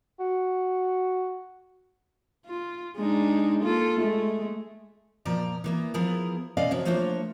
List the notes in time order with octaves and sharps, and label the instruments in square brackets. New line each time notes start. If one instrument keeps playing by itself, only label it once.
[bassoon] F#4
[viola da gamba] F4
G#3 D4 D#4
A#3 F4 A4
G#3 A3
[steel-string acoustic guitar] A#2 F3 D5 A#5
E3 A#3 B3
F3 B3 E4 G#4 A#4
B2 C#4 D5 D#5 F5
C3 F3 F#3
F3 A3 A#3 D4 F4 C#5